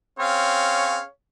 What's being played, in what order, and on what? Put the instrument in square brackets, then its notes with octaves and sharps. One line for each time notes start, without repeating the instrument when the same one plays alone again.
[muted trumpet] C4 [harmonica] C#4 G#4 F5 [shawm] C#5